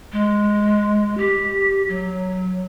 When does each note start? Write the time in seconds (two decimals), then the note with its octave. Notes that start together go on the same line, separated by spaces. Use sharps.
0.13 G#3
1.18 G4
1.89 F#3